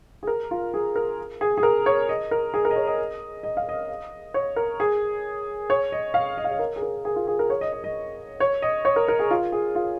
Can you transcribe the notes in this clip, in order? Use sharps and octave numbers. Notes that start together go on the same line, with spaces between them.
G#4
A#4
F4
G#4
A#4
G#4
G#4
A#4
C#5
D#5
A#4
G#4
A#4
D#5
C#5
D#5
D#5
F5
D#5
C#5
A#4
G#4
C#5
D#5
F5
D#5
F5
D#5
A#4
G#4
A#4
G#4
F4
G#4
A#4
C#5
D#5
D#5
D#5
C#5
D#5
C#5
A#4
A#4
G#4
F4
G#4
F4